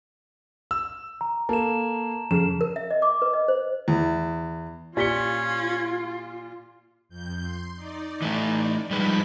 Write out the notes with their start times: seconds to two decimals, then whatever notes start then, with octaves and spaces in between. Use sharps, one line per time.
0.71 E6
1.21 A#5
1.49 A#3 A4 A5 E7
2.31 F2 C#3 E7
2.61 A#4
2.76 E5
2.91 D#5
3.02 D6
3.22 B4
3.33 D#5
3.48 C5
3.88 E2
4.97 A#2 C#4 F4 G4 B6 C#7 G7
7.09 F2 G6
7.43 C6
7.75 D#4 D5
8.22 E3 A3
8.91 F3 G3 G#3 D#4 B4 B6